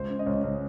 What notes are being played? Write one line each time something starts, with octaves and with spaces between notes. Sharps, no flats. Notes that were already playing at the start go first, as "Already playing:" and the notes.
Already playing: C#2 C5
C#3
D#5
C#2 C#5
C#2